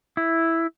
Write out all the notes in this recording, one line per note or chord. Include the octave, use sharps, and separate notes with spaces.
E4